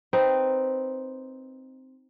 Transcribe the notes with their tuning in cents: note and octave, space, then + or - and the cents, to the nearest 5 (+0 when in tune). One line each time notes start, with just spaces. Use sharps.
C4 +0 D#4 +0 B4 +0